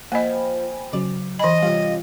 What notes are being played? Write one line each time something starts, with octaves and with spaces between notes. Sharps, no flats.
F3 A#3 D#5 G5 G#5 B5
C#3 F#3 D5
E3 D#5 G#5 B5
C3 G3 C#4 F4 F5